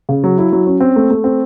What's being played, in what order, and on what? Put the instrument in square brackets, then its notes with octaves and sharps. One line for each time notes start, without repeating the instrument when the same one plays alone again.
[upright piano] C#3
F#3
E4
F#3
C#4
C4
A3
A3
C4